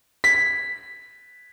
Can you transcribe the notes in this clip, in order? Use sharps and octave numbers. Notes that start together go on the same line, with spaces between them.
B6